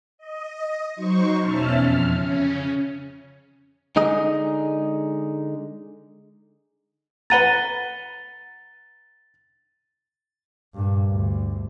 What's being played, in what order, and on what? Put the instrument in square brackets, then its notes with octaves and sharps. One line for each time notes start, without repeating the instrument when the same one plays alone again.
[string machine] D#5
F#3 D#4 C5 C#6
E2 B2 C#4 E5 A5 F6
F2 F6
C#3 C#4
[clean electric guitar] D3 G#3 D#4 G#4 D#5
[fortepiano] B4 F#5 A#5 [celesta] A6 D#7 G7
[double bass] G2 A#2
D2